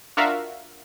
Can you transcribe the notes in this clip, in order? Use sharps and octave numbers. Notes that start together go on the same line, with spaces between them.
D4 F4 F#4 A#4 E5 F5